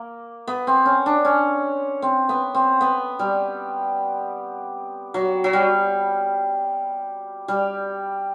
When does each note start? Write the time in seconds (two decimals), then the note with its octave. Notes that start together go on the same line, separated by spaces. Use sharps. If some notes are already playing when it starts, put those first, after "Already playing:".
Already playing: A#3
0.47 B3
0.67 C4
0.85 C#4
1.06 D4
1.25 C#4
2.02 C4
2.29 B3
2.55 C4
2.81 B3
3.19 G3
5.14 F#3
5.44 F#3
5.53 G3
7.48 G3